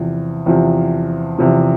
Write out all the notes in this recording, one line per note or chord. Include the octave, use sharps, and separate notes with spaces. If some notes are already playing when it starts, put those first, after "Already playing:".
Already playing: E2 C3 F3
E2 C3 F3
E2 C3 F3